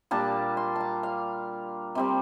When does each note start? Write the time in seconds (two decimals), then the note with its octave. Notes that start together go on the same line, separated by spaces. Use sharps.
0.11 A#2 G3 A#3 D4 A5
0.57 C6
0.76 A5 A#5
1.03 F5
1.95 C3 G3 C4